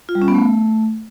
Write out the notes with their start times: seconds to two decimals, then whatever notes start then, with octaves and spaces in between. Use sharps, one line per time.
0.09 F4
0.15 G3
0.22 C#4
0.28 B3
0.34 A3